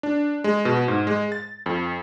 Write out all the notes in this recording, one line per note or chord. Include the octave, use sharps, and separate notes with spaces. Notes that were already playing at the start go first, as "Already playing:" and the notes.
D4
G#3
B2
G#2
G#3
A6
F2